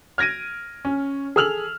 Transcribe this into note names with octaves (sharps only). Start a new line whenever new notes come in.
F6 G#6 A#6 D7 D#7
C#4
G#4 A4 E6 F6 F7 F#7